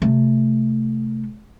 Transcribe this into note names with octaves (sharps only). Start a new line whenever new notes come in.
C3 A3